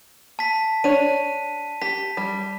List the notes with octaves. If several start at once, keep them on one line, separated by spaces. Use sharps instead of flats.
A5 B6
D4 C#5 D#7
G4 B6
G3